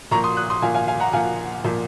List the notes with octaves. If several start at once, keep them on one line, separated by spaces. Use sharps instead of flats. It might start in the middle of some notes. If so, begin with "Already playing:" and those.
A#2 F3 A#5 C#6
C6 D#6
D#6 F#6
C6 D#6
A#2 F3 F5 G#5
F5 G#5
F5 G#5
F#5 A#5
A#2 F3 F5 G#5
A#2 F3